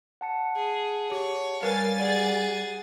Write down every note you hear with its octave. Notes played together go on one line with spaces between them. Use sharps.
F#5 A5 C#7
G#4
G4 C#5
G3 A#4 B4 F5 G#5 A6
G#4 D5 F#5